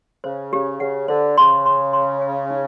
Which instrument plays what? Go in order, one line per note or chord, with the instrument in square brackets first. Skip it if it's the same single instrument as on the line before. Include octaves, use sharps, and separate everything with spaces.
[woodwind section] C#3 [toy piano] C5
[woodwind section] C#3 [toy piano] G4
[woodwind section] C#3 [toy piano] F#5
[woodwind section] D3 [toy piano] C5
[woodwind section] C#3 [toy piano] C6
[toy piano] C6
C6
G#5
D#4